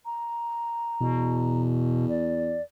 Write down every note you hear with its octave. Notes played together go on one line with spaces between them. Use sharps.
A#5
E2 B2
D5